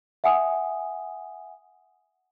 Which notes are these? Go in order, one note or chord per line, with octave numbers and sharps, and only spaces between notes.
E5 F#5 G#5 D#6